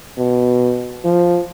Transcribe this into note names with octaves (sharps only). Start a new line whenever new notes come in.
B2
F3